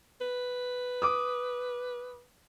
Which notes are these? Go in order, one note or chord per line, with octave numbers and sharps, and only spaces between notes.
B4
D6 D#6